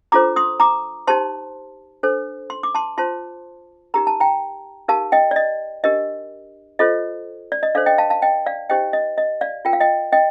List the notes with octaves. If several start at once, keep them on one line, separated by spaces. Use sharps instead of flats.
D4 F4 A4 C5 A#5 D6
C6 D#6
A#5 D6
D#4 G4 C5 A5 C6
D4 A4 C5
C6
D6
A5 C6
F4 C5 A5 C6
D#4 G4 A#4 A#5
A5
G5 A#5
D#4 G4 A#4 F5 A5
D#5 G5
D5
D#5
D4 G4 A#4 D#5
F4 A4 C5 D#5
D5
D#5
D4 A4 C5 D5 F5
D#5 G5
F5 A5
F5 A5
D#5 G5
D5 F5
D#4 G4 C5 D#5 G5
D#5
D#5
D5 F5
F4 A#4 G5
F5
D#5 G5
D#5 G5